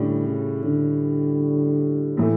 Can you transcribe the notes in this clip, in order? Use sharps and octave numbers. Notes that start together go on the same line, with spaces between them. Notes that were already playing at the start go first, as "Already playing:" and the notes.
Already playing: A2 D3 G3 C#4
C#3
D3
A2 E3 A3